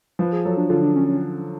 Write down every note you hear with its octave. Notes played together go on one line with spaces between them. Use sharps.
F3 B4
G#4
F#3 A4
D4
D3 F4
D4
C#4
C#4